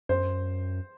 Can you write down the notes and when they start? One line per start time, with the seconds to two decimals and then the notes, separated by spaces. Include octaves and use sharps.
0.09 F#2 C5